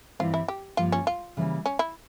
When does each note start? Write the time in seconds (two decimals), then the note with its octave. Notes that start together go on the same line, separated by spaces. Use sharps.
0.19 G2 E3 G3 C4 F4 G4
0.34 E4
0.48 G4
0.77 G2 F3 A#3 F4
0.92 C#4
1.07 F4
1.37 C#3 E3 G3 A#3 C#4
1.66 C#4
1.79 E4